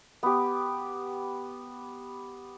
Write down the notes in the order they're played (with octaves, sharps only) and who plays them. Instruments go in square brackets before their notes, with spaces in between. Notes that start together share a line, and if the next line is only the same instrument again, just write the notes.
[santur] B3 G4